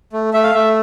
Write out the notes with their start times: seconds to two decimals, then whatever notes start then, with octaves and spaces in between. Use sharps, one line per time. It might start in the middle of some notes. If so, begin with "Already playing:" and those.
0.13 A3
0.33 A3 E5
0.43 F5
0.54 A3 E5